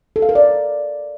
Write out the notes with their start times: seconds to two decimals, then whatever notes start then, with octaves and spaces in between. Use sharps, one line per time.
0.16 A4
0.22 F5
0.29 A#4
0.35 D5